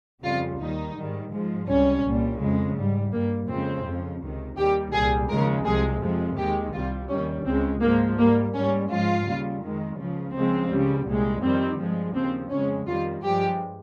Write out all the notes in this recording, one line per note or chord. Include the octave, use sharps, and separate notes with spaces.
F2 C#3 G3 F4
D#2 D#3 G3 D#4
G#2 D#3 G3
G#2 F3 G#3
C#2 C3 G3 C#4
C2 A#2 G3
F2 C#3 G#3
G#2 G3
G2 G3 A#3
F2 C#3 F3 G#3 C4
F2 C#3 F3
C#2 C3 D#3
D#2 D#3 G3 G4
C2 A#2 G3 G#4
D#2 C#3 F3 G#3 A#4
C2 C3 F3 G#3 G#4
F2 C3 F3 G#3
D#2 D#3 G#3 G4
C2 C3 G3 F4
D#2 D#3 G3 C#4
C#2 C#3 G#3 C4
G#2 F3 G#3 A#3
G#2 G3 A#3
G#2 G3 C#4
G#2 F3 G#3 F4
D#2 C#3 G3
F2 D#3 G#3
C#2 C#3 F3
C#2 C#3 F3 G#3 C4
C#2 C#3 G3
C2 A#2 G#3
F2 D#3 G3 C4
G2 F3 G#3
D#2 C#3 F3 C4
F2 C#3 G#3 C#4
F2 D#3 G3 F4
G2 F3 G#3 G4